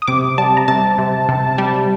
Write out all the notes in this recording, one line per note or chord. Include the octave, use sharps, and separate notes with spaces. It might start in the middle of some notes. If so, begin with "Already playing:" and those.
D#6
C3 D6
G3 A5
A#5
C3 A5
C3
C3
G3